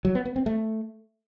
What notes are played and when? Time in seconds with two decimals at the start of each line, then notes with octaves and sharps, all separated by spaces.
0.05 F#3
0.15 B3
0.25 B3
0.36 C4
0.46 A3